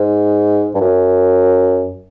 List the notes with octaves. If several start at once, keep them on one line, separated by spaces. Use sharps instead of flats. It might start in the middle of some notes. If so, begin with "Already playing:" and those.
Already playing: G#2
G2
F#2